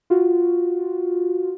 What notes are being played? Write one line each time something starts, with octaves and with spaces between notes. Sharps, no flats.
F4 F#4